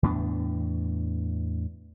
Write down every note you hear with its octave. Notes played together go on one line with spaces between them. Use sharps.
E2 A2 B3 D4